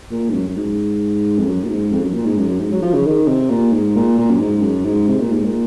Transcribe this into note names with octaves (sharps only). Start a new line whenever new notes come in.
A#2
G#2
F#2
F#2
G#2
F2
F#2
A#2
G#2
F2
F#2
A#2
G#2
F#2
F#2
G#2
F#3
F3
C#3
D#3
C3
A#2
G#2
A#2
A#2
F#2
G#2
F#2
G#2
C3
A#2
G#2
A#2